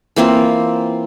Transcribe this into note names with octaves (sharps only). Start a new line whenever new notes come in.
E3 A#3 C4 F4